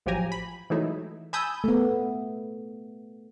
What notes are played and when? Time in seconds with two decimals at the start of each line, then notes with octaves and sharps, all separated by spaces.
0.06 A1 F3 F#3 G4 G#5 A#5
0.32 B5
0.70 E3 F#3 G#3 A3 D#4 E4
1.33 G#5 A5 B5 D#6 E6 G6
1.64 A3 B3